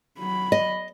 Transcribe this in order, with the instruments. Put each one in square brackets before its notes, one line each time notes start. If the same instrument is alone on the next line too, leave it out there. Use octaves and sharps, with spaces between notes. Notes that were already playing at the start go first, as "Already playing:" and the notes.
[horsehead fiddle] F#3 B5
[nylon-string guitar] D#5